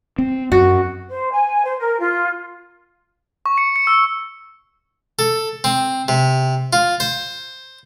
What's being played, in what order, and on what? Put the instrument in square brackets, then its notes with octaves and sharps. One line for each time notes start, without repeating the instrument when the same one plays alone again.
[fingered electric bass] C4
[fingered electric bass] F#2 [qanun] F#4
[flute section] C5
G#5
C5
A#4
F4
[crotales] C#6
C#7
C#7
E6
[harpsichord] A4
C4
C3
F4
C5